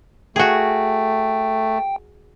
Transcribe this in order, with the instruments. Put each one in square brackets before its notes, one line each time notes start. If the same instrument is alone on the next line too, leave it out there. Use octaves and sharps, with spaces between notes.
[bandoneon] A3 [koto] F#4 G#4 [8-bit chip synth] G5